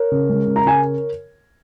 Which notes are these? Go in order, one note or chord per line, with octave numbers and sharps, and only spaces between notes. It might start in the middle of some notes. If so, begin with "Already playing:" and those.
Already playing: A#4 C#5
C#3
G#3
C#3
A#5
C#3 G#5